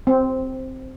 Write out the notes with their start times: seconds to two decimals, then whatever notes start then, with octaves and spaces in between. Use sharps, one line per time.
0.07 C4